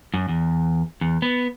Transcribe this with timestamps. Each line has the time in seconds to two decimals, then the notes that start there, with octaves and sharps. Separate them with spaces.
0.14 F#2
0.29 E2
1.01 E2
1.22 B3